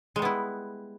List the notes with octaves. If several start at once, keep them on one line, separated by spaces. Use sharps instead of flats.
G3 G#3 B3 E4